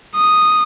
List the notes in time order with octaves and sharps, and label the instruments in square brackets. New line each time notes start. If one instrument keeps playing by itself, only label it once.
[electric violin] D#6